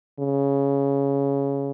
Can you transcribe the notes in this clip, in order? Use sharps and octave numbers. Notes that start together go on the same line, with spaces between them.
C#3